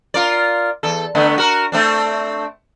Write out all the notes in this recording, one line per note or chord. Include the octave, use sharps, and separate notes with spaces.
F4 A#4 D5
E2 A4
D3 A3 B3
F#4 A#4
A3 C4 D4